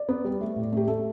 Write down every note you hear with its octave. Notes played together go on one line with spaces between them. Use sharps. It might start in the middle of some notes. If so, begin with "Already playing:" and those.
Already playing: D5
B3
G3
A3
A2
A3 G4
A3 A4